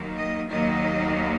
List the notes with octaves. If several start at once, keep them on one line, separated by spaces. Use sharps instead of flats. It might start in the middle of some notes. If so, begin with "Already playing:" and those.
Already playing: D#2 D#3 F#3 A#3
D#5
D#2 D#3 F#3 A#3 D#5